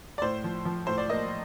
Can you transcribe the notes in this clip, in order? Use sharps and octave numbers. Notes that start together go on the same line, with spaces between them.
D5
A2 C5
F3
F3
A2 C5
D5
A#3 D#5